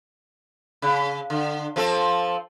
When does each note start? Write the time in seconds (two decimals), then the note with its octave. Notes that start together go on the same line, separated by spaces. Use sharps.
0.82 C#3
1.30 D3
1.76 F3 C4 A4